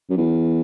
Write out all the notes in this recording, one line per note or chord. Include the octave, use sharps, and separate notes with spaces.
F#2
E2